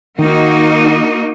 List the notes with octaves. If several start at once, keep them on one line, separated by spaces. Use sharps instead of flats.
D#3 A#3 D#4 F#4